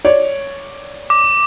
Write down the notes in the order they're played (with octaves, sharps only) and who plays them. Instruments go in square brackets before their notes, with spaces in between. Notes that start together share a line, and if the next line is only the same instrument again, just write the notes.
[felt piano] C#5 D5
[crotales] D6